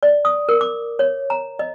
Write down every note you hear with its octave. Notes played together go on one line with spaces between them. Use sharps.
D5
D#6
A#4
D6
C#5
A#5
D#5